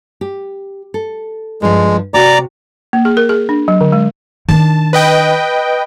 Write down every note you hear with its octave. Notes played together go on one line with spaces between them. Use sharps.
G4
A4
G2 F3 G#3
C3 F#4 D5 G5 A#5 D6
A#3
G#4
A#4
G#4
D4
F#3
D3
G#3
D#3 D4 A5
B4 D#5 G5